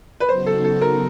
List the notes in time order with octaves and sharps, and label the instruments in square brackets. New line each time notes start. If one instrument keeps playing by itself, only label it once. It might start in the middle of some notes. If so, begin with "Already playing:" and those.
[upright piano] B4
[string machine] C#3 F#3 B3 D#4 F#4 [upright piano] C5
[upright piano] A4
A4
A#4